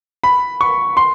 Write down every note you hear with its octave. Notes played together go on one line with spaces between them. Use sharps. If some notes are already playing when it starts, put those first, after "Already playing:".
B5
C#6
C6